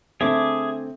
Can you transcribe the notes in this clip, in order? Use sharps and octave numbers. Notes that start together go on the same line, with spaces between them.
D3 A3 C4 G#4 E5 D6